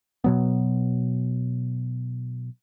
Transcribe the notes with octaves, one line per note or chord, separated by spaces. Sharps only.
B2 F#3 B3